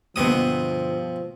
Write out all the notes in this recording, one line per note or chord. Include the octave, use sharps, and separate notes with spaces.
G2 B2 D3 F3 B3 C4 D#6